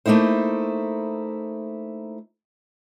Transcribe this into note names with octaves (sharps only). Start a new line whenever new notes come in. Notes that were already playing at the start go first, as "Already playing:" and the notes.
A3 A#3 D#4 E4 C5